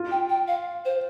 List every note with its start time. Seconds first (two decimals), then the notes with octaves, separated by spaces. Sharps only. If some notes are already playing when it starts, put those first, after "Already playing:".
Already playing: F4
0.11 G5
0.29 G5
0.48 F5
0.85 C5